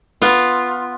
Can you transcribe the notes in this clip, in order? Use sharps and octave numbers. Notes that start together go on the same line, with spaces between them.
B3 F4